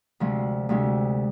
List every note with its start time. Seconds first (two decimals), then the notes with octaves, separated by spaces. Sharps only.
0.20 D2 C3 F3 G#3
0.69 D2 C3 F3 G#3